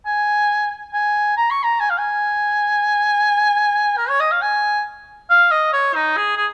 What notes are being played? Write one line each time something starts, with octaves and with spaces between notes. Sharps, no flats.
G#5
G#5
A#5
C#6
A#5
G#5
F5
G#5
A#4
C#5
D#5
F5
G#5
F5
D#5
C#5
D#4
G#4
G#4